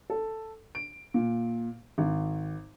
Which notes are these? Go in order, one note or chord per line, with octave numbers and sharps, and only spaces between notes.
A4
D7
A#2
G#1